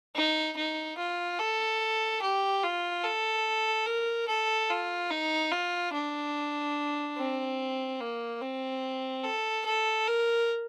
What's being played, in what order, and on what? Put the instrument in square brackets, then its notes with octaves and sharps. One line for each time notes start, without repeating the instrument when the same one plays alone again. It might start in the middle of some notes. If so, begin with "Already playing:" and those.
[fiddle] D#4
D#4
F4
A4
G4
F4
A4
A#4
A4
F4
D#4
F4
D4
C4
A#3
C4
A4
A4
A#4